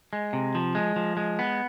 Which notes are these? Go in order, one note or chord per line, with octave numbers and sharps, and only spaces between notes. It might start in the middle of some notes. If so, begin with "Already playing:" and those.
G#3
C3
F3
G#3
F3
G#3
B3